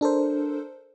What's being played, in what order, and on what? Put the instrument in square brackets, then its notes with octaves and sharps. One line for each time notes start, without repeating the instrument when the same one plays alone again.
[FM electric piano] D4 A4 A#4 C5